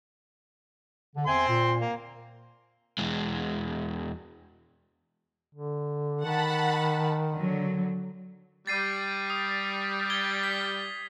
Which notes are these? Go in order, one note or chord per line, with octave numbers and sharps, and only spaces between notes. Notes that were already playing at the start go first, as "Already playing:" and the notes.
D3
E2 C4 E5 G#5 C6
A#2
A#3
E2 G#3
D3
D#3 F#5 A5 B5
D3 F#3
G3 A6 C7 D#7
D#6
G#6 G7
B6